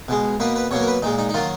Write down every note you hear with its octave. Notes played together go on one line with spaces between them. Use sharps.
B2 G#3
B2 A#3 B4
B4
B2 F#3 A#3 C#5
A#4
B4
A#2 G#3 D#4
D#4
D#4
D#3 F#3 A#3 F4